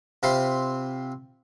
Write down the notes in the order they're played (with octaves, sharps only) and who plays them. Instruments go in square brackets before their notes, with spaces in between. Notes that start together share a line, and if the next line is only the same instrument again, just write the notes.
[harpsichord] C3 C4 F4 C5 B5 C6